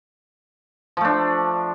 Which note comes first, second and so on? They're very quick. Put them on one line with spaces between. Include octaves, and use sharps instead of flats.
F3 A3 D4